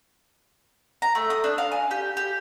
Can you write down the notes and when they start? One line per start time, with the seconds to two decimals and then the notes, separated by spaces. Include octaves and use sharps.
1.02 A#5
1.15 A3
1.30 D#6
1.44 D4
1.58 F5
1.72 G#5
1.91 G4
2.17 G4